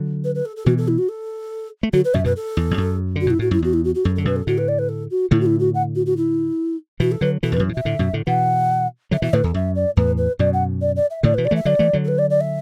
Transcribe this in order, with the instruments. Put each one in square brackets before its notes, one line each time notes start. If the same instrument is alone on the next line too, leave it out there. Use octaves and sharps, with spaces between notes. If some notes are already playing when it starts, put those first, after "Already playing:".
Already playing: [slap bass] D3 F#3
[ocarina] B4
B4
A4
A4
[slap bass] B2 E3 [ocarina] F#4
[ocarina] A4
E4
F#4
A4
[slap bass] A3
[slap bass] D3 F#3 [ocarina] F#4
[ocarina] B4
[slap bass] F#2 B2 [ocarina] E5
[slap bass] F#2 B2 [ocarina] B4
[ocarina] A4
[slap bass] E2
E2
F#2
[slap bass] D3 [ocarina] F#4
[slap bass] B2 [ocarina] E4
[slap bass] A2 [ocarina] F#4
[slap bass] F#2 [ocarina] E4
[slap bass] E2 [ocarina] F#4
[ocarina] E4
F#4
F#4
[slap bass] F#2 [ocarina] A4
[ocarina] A4
[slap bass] D3
[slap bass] F#2 B2 [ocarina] B4
[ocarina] A4
[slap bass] A2 D3 [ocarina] F#4
[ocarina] B4
D5
B4
A4
F#4
[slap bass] A2 D3 [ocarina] E4
[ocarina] F#4
E4
F#4
F#5
F#4
F#4
E4
[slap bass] B2 E3 [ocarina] F#4
[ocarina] A4
[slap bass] D3 F#3 [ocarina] B4
[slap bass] B2 E3 [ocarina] A4
[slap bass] E2 [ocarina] B4
[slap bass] F#2
A2
[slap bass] B2 [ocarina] E5
[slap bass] A2 D3
F#2 B2
A2 D3
[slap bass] B2 E3 [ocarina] F#5
[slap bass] D3 F#3 [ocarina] E5
[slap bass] B2 E3 [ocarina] E5
[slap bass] A2 D3 [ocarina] B4
[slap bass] E2 [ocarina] A4
[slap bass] F#2 [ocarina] E5
[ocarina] D5
[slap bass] E2 A2 [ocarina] B4
[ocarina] B4
[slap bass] F#2 B2 [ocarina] D5
[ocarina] F#5
D5
D5
E5
[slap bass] A2 D3 [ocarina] D5
[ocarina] B4
[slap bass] B2 E3
[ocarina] D5
[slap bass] E3 A3 [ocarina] E5
[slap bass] D3 F#3 [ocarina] D5
[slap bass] E3 A3
D3 F#3
[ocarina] A4
B4
D5
D5
E5